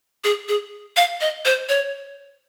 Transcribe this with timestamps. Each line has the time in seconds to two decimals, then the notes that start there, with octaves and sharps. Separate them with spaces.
0.24 G#4
0.48 G#4
0.97 F5
1.21 D#5
1.45 C5
1.69 C#5